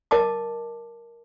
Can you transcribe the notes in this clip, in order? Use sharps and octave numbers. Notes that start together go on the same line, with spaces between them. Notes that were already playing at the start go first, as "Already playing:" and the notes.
A#4 D#5 A5 D6